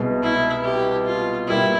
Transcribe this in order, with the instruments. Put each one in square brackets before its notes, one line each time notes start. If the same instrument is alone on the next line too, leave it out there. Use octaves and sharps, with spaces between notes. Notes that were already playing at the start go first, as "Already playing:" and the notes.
Already playing: [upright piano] C2 B2 G#3 B3
[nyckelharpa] E4
G4
F4
[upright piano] B2 G3 A#3 [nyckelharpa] E4